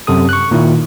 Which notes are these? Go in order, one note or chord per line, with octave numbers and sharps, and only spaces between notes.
F#2 C3 A4 D#6
C#6 F#6
A#2 D#3 E4